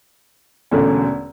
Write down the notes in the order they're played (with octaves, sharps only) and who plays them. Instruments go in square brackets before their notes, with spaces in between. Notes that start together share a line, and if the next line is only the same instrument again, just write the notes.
[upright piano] E1 E2 D3 A3 C#4